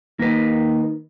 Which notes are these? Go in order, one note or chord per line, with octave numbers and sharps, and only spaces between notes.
D#3 A#3 B4